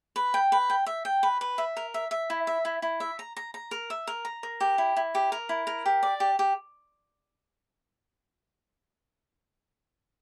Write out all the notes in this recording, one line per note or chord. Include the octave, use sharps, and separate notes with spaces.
B4
G5
B4
G5
E5
G5
B4
B4
E5
A#4
E5
E5
E4
E5
E4
E4
E5
A#5
A#5
A#5
A#4
E5
A#4
A#5
A#4
G4
E4
E4
G4
A#4
E4
A#4
G4
D5
G4
G4